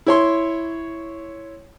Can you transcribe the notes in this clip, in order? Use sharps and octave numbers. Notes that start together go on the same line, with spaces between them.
E4 C#5 C6